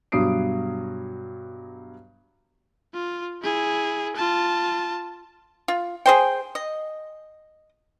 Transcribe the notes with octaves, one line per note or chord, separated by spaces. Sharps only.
G2 B2 F#3 D#6 C7 D7
F4
E4 G#4
F4 A5
F4
G#4 C5 G5
D#5